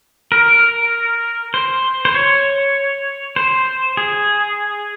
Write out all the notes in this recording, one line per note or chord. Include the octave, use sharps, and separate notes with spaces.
A#4
C5
C5
C#5
C5
G#4